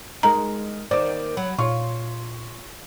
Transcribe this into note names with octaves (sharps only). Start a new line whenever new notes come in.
G#3 D#4 A#4 D#5 A#5
D#3 A#3 C5 D5 D6
F#3 B5
A#2 F4 C#5 C6 C#6